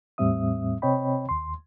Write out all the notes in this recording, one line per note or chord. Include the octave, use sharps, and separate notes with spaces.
E2 A2 G3 C4 E5 D#6
C3 C4 C#5 D#5 G5 B5
D#2 C6